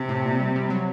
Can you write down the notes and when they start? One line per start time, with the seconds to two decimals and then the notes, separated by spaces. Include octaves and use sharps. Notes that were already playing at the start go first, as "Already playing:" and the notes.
Already playing: C3
0.09 A2
0.24 A#2
0.40 G3
0.56 G3
0.70 F#3